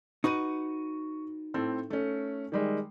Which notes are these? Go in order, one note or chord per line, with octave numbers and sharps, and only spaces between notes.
D#4 F#4 B4 C#6 D#7
A2 C4 A4
A3 C#4
D#3 G3 G#3